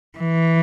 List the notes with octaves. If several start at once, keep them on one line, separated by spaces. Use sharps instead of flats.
E3